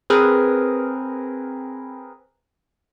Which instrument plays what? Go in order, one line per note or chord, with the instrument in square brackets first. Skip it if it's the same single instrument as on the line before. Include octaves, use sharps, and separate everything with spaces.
[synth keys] C4 G#4 A#4 B4